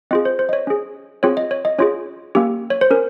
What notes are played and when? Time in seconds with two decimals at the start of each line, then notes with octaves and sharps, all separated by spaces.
0.11 C4 F4 G#4 D#5
0.25 C5
0.39 C5
0.49 D#5
0.53 C#5
0.67 C#4 G#4
1.23 C4 F4 G#4 C#5
1.37 D#5
1.51 C#5
1.65 D#5
1.78 C#4 F4 G#4 C#5
2.35 A#3 C#4 G4
2.70 C#5
2.81 C5
2.91 C#4 A#4